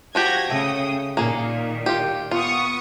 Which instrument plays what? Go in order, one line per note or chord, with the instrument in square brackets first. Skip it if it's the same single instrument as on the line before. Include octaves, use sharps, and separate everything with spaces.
[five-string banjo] F3 F#4 G4 [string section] G#6 A#6
[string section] C#3 G5 D#6 [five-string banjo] A3
[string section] A#2 D#3 [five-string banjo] A#3 G#4
[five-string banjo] F4 G4
[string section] B3 C#6 D#6 [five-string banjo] F4